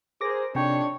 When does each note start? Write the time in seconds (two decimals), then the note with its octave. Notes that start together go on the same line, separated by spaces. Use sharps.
0.21 G#4 A#4 C5 D6 A#6
0.55 F2 C3 D#3 D4 C#5 G5